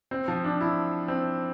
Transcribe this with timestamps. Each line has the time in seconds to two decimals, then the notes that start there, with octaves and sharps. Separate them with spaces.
0.11 C4
0.28 F3
0.44 D4
0.61 E4
1.08 C4